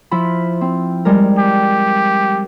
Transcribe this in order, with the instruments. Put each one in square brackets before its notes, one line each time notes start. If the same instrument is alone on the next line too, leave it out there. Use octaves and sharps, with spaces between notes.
[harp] F3 E4 B5
C4
G3 G#3 A#4
[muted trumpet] G4